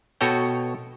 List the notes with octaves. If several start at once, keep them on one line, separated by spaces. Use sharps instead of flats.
B2 F#4 A4 C#5 G5